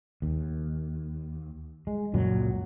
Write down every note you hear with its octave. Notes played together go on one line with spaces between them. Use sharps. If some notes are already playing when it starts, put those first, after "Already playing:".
D#2
G#3
C#2 F#2 A#2 F#3